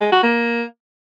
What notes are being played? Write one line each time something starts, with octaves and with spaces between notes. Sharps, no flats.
G#3
F#4
A#3